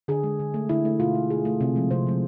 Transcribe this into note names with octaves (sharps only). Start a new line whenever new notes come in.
D3 G#4
G#3
D3
A3
D3 E4
A3
B2 F4
A3
B2 G#4
A3
C3
F3 G#3
C3 C5
F3 G#3